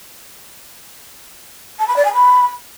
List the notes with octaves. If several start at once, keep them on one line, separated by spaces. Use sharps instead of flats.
A5
B5
D5
G#5
B5